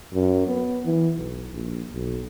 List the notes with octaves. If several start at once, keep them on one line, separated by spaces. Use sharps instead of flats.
F#2
B3
E3
B1
A#1
B1